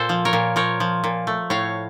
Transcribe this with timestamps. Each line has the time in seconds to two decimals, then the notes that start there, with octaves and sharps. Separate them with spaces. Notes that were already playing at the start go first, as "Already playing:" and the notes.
Already playing: A#2 A4 C5
0.09 F3
0.25 A#4 C#5
0.33 A#2
0.56 F3 A#4 C#5
0.80 F3
1.04 A#2
1.27 A3
1.50 A2 C#5 F5